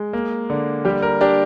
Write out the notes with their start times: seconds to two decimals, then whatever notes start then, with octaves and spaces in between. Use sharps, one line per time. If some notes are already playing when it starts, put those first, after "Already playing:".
Already playing: G#3
0.13 A#3
0.50 D3
0.85 G3 G4
1.02 A#4
1.21 D4 G4